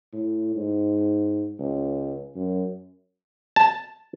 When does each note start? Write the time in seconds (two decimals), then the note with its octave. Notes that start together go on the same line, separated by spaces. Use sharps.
0.13 A2
0.55 G#2
1.59 C#2
2.35 F#2
3.56 A5